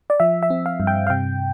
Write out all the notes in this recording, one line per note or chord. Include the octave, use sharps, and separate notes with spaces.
D5
F3 E5
E5
C4
F5
G2
G5
F5
C3 G5